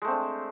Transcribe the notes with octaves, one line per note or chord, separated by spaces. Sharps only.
G#3 A3 C4 D4